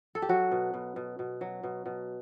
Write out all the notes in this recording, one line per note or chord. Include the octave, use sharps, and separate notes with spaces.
A4
G4
F#3 F#4
B2
B2
B2
B2
F#3
B2
B2